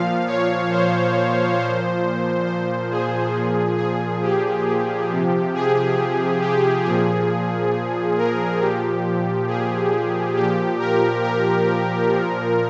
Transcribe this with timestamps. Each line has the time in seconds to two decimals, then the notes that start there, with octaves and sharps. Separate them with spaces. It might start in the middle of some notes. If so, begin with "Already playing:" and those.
Already playing: A#2 F3 F5
0.27 C#5
0.71 C5
1.59 A#2 F3 C5
2.47 C5
2.91 G#4
3.34 A#2 F3
3.78 G#4
4.22 G4
5.09 C3 F3
5.54 G#4
6.41 G4
6.85 A#2 F3 G#4
8.17 A#4
8.60 A#2 F3 G4
9.48 G#4
10.36 A#2 F3 G4
10.79 A#4
11.24 A#4
12.11 A#2 F3